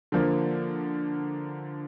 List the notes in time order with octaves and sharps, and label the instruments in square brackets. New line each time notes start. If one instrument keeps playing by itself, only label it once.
[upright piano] D3 F3 A#3